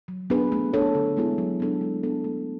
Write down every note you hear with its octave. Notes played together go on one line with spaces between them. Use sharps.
F#3
B3 D4 G#4 B4
A3
D4 A4 C#5
D3
G#3 B3 E4 G#4
F#3
B3 D4 A4
G#3
B3 D4 A4
A3